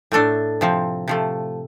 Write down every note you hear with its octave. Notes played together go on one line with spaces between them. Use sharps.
A2 A3 D4 A4
C3 F3 C4
C3 F3 A3